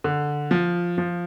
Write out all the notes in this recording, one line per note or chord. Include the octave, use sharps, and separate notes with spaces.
D3
F3
F3